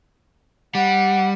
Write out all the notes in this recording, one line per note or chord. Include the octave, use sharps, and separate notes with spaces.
G3 F#5